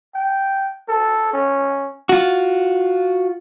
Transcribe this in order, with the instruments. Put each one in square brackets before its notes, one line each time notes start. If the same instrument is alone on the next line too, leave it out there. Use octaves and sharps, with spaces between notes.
[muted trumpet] G5
A4
C#4
[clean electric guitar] F4 F#4